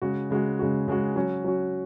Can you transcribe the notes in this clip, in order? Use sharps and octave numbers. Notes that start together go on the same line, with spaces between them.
C#3 G#3 F#4
C#3 G#3 F#4
C#3 G#3 F#4
C#3 G#3 F#4
F#3 C#4 F#4
F#3 C#4 F#4